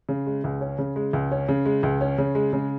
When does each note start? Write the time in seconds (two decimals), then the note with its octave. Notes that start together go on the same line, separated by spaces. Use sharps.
0.09 C#3
0.27 G#3
0.44 C#2
0.61 C#4
0.78 C#3
0.96 G#3
1.13 C#2
1.31 C#4
1.49 C#3
1.66 G#3
1.83 C#2
2.01 C#4
2.18 C#3
2.35 G#3
2.53 C#3